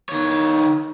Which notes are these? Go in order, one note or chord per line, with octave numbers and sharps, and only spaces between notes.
D#3 C#5